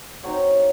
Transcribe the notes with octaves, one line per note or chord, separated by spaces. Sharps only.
F#3 C4 D#4 C#5